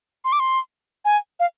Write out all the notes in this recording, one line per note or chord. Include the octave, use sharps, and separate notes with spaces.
C6
D6
C6
G#5
F5